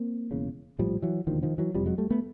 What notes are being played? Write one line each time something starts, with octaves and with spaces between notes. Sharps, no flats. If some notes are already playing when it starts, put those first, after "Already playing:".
Already playing: A#3 C4
E1 E2 C#3
A#1 A2 F3 G3
E3 F#3
E1 D#2 D3 D#3 F3
D#3 F3
E3 F#3
F#1 F2 C3 F3 G3
F#3 G#3
G3 A3
A3 B3